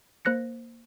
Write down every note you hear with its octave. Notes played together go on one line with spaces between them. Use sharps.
A#3 C5 F#6 A#6 C#7